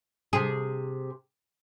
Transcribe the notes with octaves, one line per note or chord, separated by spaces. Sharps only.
C3 G#4